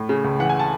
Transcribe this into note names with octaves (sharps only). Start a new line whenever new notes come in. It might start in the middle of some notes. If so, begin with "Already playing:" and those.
Already playing: A2
C#3
C#2
E3 F#5
G#5
A5